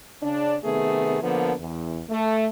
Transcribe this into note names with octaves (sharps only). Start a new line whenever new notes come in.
C#3 D4
C3 D#3 A3 B3 G#4
D3 F3 A#3 B3 A#4
E2
A3